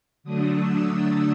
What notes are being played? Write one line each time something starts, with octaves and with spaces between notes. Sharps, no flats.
D3 F#3 A3 D4 D#6
E6
E6